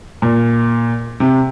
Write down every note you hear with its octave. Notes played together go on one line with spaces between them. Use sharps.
A#2
C3